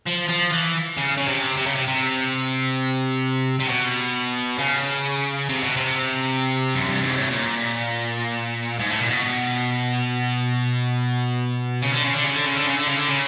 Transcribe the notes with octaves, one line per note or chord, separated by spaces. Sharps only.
F3
F3
E3
C#3
C#3
C3
C3
C#3
C3
C3
C3
B2
C#3
C3
B2
C3
F#2
G2
G#2
A2
A#2
G#2
A2
A#2
B2
C#3
D3
C#3
D3
C#3
D3
C#3
D3
C#3
D3
C#3
D3
C#3